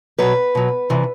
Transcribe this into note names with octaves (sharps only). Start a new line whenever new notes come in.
B2 F#3 B4
B2 F#3
C3 E3